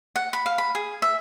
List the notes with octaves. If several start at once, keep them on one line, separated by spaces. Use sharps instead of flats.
F#5
B5
F5
B5
G#4
E5